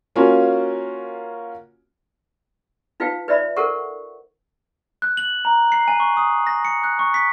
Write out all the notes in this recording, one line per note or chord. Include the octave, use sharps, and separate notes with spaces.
A#3 C#4 F4 F#4 G#5
D#4 F4 B4 F5 G5
B4 D5 E5 B5
A4 A#4 C5 F#5 C#6
F#6
F#7
A#5
C7
G#5
C#6
D#6
A#6
C#7
F#6
C#6
B6